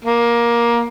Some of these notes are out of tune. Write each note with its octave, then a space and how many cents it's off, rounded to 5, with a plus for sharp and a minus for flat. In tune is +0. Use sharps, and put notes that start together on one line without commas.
A#3 +15